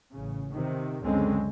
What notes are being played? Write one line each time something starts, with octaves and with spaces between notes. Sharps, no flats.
A1 C#3
C3 D#3
C#2 F#2 D3 G#3 C4 C#4